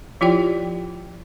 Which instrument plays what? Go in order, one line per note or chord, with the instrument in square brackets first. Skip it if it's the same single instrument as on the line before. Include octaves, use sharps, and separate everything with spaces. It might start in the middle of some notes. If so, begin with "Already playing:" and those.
[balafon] F3 E4 F4 G4 D5 G5